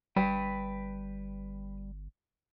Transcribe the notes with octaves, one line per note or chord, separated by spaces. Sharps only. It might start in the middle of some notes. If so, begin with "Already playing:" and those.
G1 G3 B4 G5